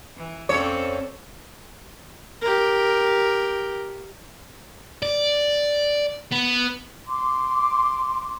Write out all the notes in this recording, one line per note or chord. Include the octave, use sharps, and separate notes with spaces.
E3
F2 C4 C#4 A4 C#5 D5
G4 A#4
D5
B3
C6 D6